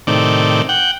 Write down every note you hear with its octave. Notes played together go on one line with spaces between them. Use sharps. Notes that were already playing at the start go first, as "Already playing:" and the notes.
A2 C3 D#3 D5
F#5 G5